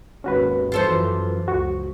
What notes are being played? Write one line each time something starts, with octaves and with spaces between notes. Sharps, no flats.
G#1 D#2 G#3 C#4 F#4 B4
F#2 E3 F3 F4 A4 C5
C#2 F#4 C#6